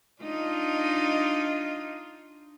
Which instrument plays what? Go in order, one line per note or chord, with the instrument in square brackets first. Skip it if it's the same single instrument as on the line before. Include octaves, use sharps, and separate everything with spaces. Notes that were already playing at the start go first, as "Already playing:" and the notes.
[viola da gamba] D4 D#4 F4